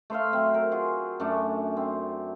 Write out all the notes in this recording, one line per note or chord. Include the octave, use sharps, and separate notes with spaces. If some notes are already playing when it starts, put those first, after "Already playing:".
A3 C5 E5 F5
F#3 C4
A#4
F4 F#4 G#4
F#2 A3 C#4 D4
C4